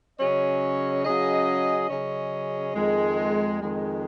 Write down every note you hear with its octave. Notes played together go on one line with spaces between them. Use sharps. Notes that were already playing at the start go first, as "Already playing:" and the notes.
C#3 F#3 C#4 G#4 D#5
C#3 F#3 C#4 G#4 D#5
C#3 F#3 C#4 G#4 D#5
F2 D#3 G#3
F2 D#3 G#3